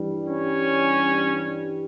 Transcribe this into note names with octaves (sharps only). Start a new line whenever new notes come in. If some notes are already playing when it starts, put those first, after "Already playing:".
Already playing: G2 E3 G3
C#4